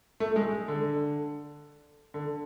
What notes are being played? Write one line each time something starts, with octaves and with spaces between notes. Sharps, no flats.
A3
G#3
D3
D3